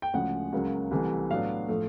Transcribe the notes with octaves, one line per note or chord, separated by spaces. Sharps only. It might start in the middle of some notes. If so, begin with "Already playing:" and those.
G5
D2 C#3 F3 G#3 C#4 F#5
C#2 C#3 F#3 A#3
C2 C3 E3 A3
A2 F#3 B3 D4 F5
A2 F3 A3